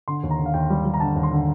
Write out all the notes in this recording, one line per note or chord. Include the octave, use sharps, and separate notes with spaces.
D3 C6
D#2
A#5
D3
F5
D#2 G5
G3
G3
A#5
D3 A5
D#2
C6
D3